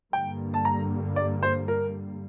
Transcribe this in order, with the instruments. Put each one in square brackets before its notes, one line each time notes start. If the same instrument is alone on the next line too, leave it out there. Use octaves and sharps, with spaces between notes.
[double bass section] G2 D3 G3 A#3 [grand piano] G5
[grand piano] A5
A#5
D5
C5
A#4